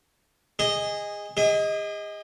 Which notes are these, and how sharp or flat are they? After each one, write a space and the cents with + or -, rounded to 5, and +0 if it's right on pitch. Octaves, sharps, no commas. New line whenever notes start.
G#4 -20 D#5 +0
G#4 -40 D#5 +15